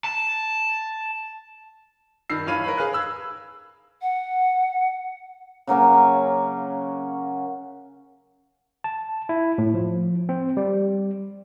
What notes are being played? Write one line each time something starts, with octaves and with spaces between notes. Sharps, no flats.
A5
G2 D#3 E6 C7
G2 E3 C#5 F5 B5 D#7
A#4 B4 B5
G#4 B4 F5 F#6
B5 E6 G#6
F#5
C#3 F#3 A#3 C#4
A5
E4
A2
F3
C4
G3